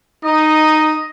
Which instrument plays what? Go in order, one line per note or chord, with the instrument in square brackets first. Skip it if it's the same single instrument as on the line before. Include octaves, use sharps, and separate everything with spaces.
[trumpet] D#4 [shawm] D#5